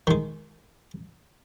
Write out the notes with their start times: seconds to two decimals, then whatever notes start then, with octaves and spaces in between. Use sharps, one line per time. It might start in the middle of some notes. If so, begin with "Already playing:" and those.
0.07 D#3 G#3